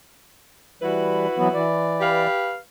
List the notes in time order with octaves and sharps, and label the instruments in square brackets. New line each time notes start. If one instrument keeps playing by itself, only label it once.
[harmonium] E3 G3 [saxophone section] E4 F#4 B4
[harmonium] E3 F#3 B3
E3 D5
[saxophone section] G4 B4 F5